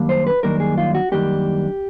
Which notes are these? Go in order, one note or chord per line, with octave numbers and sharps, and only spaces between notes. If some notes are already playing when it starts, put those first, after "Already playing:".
Already playing: F#2 D#3 G3 A#3 D4
C5
B4
F#2 D#3 G3 A#3 D4 A#4
G#4
F4
F#4
F#2 D#3 G3 A#3 D4 G4